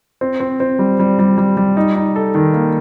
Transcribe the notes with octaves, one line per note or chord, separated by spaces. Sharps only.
C4
C4
C4
G3
G3
G3
G3
G3
D#4
D#4
A4
D#3
A#3